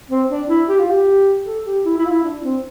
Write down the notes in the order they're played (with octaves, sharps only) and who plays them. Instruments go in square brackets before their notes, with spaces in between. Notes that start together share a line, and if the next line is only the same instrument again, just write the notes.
[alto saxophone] C4
D4
E4
G4
F4
G4
A4
G4
E4
E4
F4
E4
D4
C4